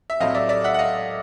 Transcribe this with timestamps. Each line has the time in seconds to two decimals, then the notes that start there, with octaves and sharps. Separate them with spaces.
0.10 E5
0.20 A2 F#3 A3 C4 D#5 F5
0.34 D5 E5
0.49 D5 E5
0.64 E5 F#5
0.74 F#5
0.79 D#5 F5